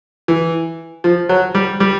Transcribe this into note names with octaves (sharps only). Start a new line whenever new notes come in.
E3
F3
F#3
G3
G3